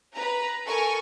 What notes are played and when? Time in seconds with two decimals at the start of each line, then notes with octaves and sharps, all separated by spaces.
0.15 B4 A#5
0.65 A4 A#4 G#5 C#6